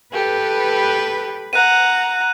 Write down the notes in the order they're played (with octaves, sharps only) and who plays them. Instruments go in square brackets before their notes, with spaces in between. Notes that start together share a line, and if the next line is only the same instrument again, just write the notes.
[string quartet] G4 A4 [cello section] B4
[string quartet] F#5 A#5 [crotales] F#6 D#7